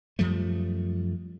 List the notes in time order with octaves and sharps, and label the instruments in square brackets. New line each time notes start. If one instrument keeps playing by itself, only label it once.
[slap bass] F#2 F3 G3 A3